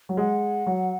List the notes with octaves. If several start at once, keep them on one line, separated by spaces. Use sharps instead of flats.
F#3
G#3 F#5
F#3